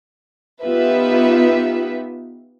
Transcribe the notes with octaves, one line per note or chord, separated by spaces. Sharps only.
B3 D#4 F4 G4 B4 E5